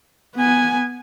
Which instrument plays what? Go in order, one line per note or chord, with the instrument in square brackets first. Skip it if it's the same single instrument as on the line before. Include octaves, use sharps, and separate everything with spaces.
[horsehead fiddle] B3 G#5